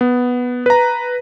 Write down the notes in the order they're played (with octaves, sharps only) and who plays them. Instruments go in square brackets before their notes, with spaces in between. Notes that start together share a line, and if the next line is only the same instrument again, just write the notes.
[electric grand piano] B3
B4 A#5